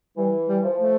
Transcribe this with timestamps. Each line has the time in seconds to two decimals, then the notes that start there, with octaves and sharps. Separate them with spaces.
0.17 E3 G3
0.48 G3
0.64 F3
0.79 A3